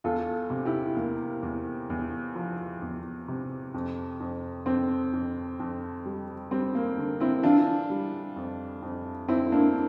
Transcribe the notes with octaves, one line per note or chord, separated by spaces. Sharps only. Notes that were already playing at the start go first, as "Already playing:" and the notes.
E2 F4 A4
C3
E4 G4
E2 A#3
E2
E2
F3
E2
C3
F2
F2
F2 C4
F2
F2
G3
G3 C4
A#3
D3
C4 E4
E3 D4 F4
G3
F2
F2
F2 C4 E4
A#3 D4